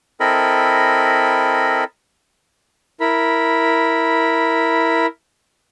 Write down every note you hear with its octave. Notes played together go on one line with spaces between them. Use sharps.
C4 E4 A4 A#4 D#5 B5
E4 A#4 B5